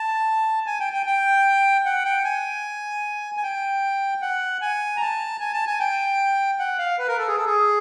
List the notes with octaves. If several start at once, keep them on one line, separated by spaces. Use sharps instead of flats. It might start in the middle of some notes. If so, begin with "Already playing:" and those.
Already playing: A5
G#5
G5
G5
G5
F#5
G5
G#5
G#5
G5
F#5
G#5
A#5
A5
G#5
A5
G#5
G5
F#5
F5
B4
A#4
A4
G#4
A4
G#4